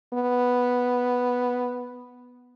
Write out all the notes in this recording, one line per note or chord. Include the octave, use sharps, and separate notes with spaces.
B3